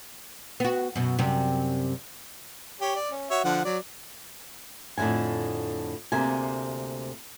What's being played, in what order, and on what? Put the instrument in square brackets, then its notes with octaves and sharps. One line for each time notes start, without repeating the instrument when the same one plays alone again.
[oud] B3 F#4
F#2 B2
F#2 C3 G3
[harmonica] G4 C#5
D5
C#4
F#4 C#5 E5
D3 F3 F#5
F#3 D5
[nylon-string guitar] F2 A2 D3 F3 G#5
D2 C3 A#3 G#5